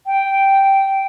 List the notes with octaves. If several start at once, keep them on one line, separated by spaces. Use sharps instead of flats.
G5